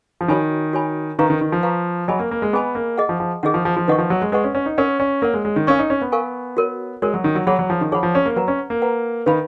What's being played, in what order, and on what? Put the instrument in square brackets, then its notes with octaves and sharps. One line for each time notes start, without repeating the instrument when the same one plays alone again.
[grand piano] F3
[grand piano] D#3 [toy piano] F#4 C#5 G#5 B5
[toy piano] F#4 C#5 G#5 B5
[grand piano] D#3 [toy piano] B4 F5 A#5 C#6
[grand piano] D#3
D#3
F3
[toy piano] B4 F5 A#5 C#6
[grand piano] F#3 [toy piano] G#4 D#5 G#5 B5
[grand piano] A#3
A#3
G#3
[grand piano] B3 [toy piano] G#4 D#5 G#5 B5
[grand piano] A#3
[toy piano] G#4 D#5 F#5
[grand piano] F3
F3
[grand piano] D#3 [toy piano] G#4 D#5 F#5
[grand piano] F3
F3
F3
[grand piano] D#3 [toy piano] B4 D#5 F#5 C#6
[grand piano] F3
F#3
G#3
[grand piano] G#3 [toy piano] B4 D#5 F#5 C#6
[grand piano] C#4
C#4
D#4
[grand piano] C#4 [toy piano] A#4 C#5 F#5
[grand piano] C#4
[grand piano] A#3 [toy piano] A#4 C#5 F#5
[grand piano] G#3
G#3
D#3
[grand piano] C#4 [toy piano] A#4 F5 G#5 C#6
[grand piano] D#4
C#4
B3
[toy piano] A#4 F5 G#5 C#6
F#4 A#4 C#5
[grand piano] G#3 [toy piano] F#4 A#4 C#5
[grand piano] F#3
D#3
F#3
[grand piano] F#3 [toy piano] G#4 C#5 F#5 B5
[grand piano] F#3
F3
D#3
[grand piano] F3 [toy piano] G#4 C#5 F#5 B5
[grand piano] F3
C#4
A#3
[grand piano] F#3 [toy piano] B4 F#5 A#5
[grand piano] C#4
A#3
[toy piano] B4 F#5 A#5
[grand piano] D#3 [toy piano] B4 F5 B5